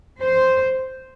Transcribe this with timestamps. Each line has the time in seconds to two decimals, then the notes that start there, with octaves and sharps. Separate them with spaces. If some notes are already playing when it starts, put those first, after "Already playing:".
0.21 C5